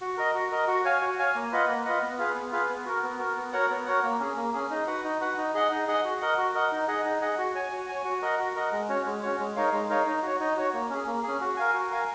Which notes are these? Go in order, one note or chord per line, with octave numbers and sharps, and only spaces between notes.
F#4
A#4 D#5
F#4
A#4 D#5
F#4
C#5 F5 G#5
F#4
C#5 F5 G#5
A#3
F4 B4 D#5 F#5
A#3
F4 B4 D#5 F#5
B3
F4 G#4 B4 F5
B3
F4 G#4 B4 F5
B3
F#4 A#4
B3
F#4 A#4
B3
F#4 A#4 C#5 F#5
B3
F#4 A#4 C#5 F#5
A#3
C#4 G#4
A#3
C#4 G#4
D#4
F#4 B4 F#5
D#4
F#4 B4 F#5
D#4
G#4 D#5 F#5
D#4
G#4 D#5 F#5
F#4
A#4 D#5 F#5
F#4
A#4 D#5 F#5
D#4
G#4 D#5 F#5
D#4
G#4 D#5 F#5
F#4
C#5 G#5
F#4
C#5 G#5
F#4
A#4 D#5 F#5
F#4
A#4 D#5 F#5
G#3
C#4 F#4 C#5
G#3
C#4 F#4 C#5
G#3
D#4 A#4 C#5 F5
G#3
D#4 A#4 C#5 F5
D#4
F#4 C#5
D#4
F#4 C#5
A#3
C#4 G#4
A#3
C#4 G#4
F#4
A#4 F5 G#5
F#4
A#4 F5 G#5